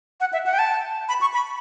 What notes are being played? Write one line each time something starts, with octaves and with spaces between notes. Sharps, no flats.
F#5
E5
F#5
G5
A5
B5
C#6
B5